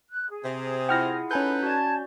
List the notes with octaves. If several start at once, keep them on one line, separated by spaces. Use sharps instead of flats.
F#6
G#4
C3
E4 F4 F#5 G5 F6 A#6
C#4 D#4 A4 B4 G#5 G6
F#4 D5 A5 G#6